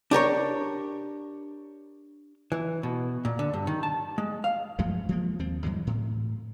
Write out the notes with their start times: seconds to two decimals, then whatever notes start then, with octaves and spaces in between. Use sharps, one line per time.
0.11 D4 G4 A#4 C#5
2.52 E3
2.83 B2
3.25 A#2
3.39 D3
3.53 G2
3.67 D#3
3.83 A5
4.18 G#3
4.44 F5
4.79 G2 F3 G#3 A3
5.09 F3 G#3 A#3
5.39 D#2 F3 C4
5.63 G2 E3 F#3 G#3
5.87 A2